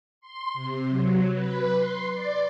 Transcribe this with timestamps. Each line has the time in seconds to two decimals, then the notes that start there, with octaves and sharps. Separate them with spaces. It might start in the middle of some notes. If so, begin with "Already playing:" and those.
0.21 C6
0.54 C3
0.89 F#3
1.33 B4
1.76 C6
2.13 D5